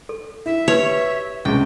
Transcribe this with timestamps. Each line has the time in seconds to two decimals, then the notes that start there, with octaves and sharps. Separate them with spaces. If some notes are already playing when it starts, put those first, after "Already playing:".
0.09 A4
0.46 E4 E5
0.68 F#4 G4 B4 C#5
1.45 C#2 C3 G5